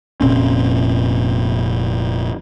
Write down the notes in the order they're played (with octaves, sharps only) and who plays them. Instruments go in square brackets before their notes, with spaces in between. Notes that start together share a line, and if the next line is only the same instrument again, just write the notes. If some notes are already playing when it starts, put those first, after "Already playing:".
[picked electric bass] F1 A#2 C4 C#4